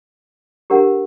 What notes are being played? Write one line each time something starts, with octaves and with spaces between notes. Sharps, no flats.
D4 G4 A#4 F#5 A#5